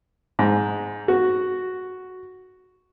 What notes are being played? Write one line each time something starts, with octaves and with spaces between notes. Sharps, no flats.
G#2
F#4